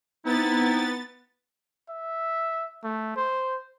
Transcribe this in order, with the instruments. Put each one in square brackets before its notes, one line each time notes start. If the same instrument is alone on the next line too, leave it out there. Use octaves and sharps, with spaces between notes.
[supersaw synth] B3 A6 [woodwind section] C4 D#4 E4
[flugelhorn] E5
A3
C5